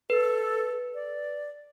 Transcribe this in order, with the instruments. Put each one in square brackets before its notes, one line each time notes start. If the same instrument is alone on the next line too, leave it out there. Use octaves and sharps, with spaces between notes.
[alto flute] A4 [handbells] B4
[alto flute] D5